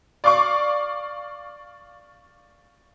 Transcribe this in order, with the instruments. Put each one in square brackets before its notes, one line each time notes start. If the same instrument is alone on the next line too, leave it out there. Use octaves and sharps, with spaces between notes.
[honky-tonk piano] D5 F5 C#6 D6